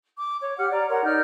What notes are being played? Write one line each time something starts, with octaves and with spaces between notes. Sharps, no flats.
D6
C#5
G4 F#5 F6
D5 A#5
A#4 C#5 F#5 C6
D#4 D5 F6 G6